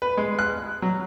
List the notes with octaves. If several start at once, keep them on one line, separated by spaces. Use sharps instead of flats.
B4
G#3
F#6
F#3